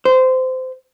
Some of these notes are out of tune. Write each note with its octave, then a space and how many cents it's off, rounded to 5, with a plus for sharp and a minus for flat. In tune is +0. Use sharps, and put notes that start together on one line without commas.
C5 -20